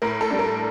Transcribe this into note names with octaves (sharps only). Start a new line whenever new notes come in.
A2 A#4
A4
G3 D4
A#4